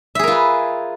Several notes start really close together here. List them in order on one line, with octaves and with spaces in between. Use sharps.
E5 G#4 A#4 F4 B4